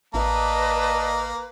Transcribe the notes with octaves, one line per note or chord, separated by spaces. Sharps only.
A1 A#3 B4 D5 D#5 A5